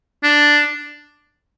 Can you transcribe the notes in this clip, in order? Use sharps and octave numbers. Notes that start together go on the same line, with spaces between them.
D4